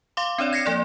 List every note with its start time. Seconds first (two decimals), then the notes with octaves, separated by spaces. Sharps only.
0.17 F5 C6 D6
0.38 C4 D4 C#5 D5
0.53 G#6 A#6 C7 C#7
0.66 F3 A#3 D5